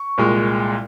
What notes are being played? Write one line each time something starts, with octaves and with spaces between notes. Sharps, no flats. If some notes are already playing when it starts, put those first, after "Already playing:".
Already playing: C#6
C2 A#2 G#3